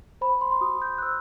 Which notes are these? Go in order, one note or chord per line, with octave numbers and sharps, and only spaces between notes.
C5 B5
C6
C6
F#4 D#6
G6
F#6
C5 E6